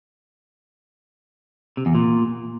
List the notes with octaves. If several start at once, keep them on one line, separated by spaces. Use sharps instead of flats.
C3
E2
A#2